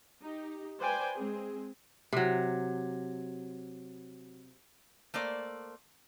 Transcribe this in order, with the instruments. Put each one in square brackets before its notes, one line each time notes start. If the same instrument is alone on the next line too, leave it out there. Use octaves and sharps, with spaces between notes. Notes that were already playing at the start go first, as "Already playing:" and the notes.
[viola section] D#4 G4
B4 C5 D5 G5 G#5
G#3 C4 G#4
[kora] C3 F#3
[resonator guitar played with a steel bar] A3 A#3 C5 D5